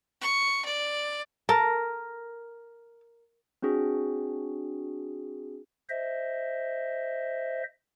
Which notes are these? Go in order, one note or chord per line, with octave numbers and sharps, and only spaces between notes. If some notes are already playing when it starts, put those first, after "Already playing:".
C#6
D5
A4 A#4 A5
C4 D4 F#4 G#4
C5 D#5 E5